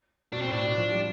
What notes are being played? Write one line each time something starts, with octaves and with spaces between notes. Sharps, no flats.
B2 D4
C4
A2
D4
B2
F3
G3